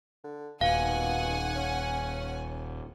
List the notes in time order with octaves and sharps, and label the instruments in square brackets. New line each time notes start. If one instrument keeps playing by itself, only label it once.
[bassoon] D3
[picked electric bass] D#1 [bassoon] B2 [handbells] F5 [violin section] F#5 G#5
[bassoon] C#4